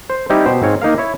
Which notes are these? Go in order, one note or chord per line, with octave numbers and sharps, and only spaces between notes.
C5
G3 C4 D#4 E4 G4
B2 G4 C5
G#2 C4 C#5 F5
A#3 D#4 A#4 F5
E4 C#5